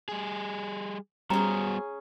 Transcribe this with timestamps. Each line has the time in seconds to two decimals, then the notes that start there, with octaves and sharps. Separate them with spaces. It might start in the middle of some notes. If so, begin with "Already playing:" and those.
0.09 G3 G#4
1.30 G3 B3 C#4 F#4 G#4 C5 A#5